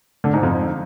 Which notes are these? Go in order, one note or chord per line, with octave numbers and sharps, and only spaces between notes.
D3
G#2
F2